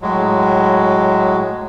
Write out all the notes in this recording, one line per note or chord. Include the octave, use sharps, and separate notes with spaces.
A2 F#3 G#3